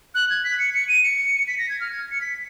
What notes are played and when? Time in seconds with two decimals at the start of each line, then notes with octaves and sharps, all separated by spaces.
0.15 F#6
0.30 G#6
0.44 B6
0.59 C#7
0.74 C#7
0.88 D#7
1.03 C#7
1.48 B6
1.58 A#6
1.69 G#6
1.80 F6
1.92 G#6
2.11 C#7
2.21 B6